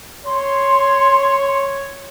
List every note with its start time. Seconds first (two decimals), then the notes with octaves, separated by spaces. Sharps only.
0.25 C#5 C6